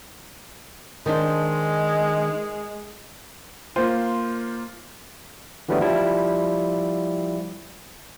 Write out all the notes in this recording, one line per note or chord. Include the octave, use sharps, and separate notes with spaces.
D#3 G#3 D4 C5
A#3 F4 C5
D3 E3 F#3 G3 A3 B3
F3 G3 E4